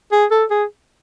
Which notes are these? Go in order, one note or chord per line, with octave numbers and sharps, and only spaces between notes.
G#4
A4
G#4